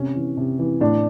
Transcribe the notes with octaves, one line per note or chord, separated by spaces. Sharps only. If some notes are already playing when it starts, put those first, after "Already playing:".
Already playing: C3 C#4
E3
C3
E3
A2 D4